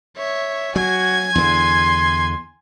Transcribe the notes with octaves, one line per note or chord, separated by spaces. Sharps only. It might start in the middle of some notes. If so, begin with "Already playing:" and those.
C#5 E5
F#3 F#4 G#5 G#6
E2 D3 C6